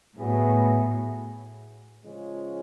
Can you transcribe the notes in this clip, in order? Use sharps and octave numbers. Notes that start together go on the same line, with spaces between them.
A2 F#3 B3 E4 G#4
C#3 F3 G#3 C#4